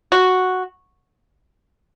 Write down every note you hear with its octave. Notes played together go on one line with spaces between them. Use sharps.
F#4